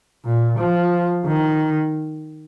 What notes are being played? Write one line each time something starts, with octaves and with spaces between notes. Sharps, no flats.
A#2
F3
D#3